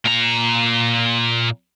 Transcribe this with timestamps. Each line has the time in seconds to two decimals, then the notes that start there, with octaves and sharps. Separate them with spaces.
0.05 A#2 A#5